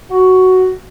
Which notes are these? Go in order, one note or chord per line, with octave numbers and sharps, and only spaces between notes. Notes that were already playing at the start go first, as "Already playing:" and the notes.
F#4